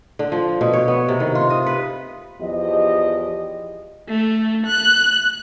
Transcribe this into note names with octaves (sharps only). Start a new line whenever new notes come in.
D3
F3
B2
C#5
B3
C3
D#3
F4
D#5
B4
E2 F3 G4 D#5
A3
F#6